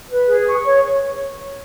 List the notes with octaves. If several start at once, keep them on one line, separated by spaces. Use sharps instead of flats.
B4
G#4
C#6
C#5